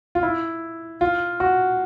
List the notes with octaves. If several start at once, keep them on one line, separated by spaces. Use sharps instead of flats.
F4
E4
F4
F#4